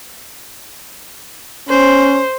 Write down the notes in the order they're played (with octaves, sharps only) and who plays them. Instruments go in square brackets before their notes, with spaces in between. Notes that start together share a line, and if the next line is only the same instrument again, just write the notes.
[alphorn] C#4 [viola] C5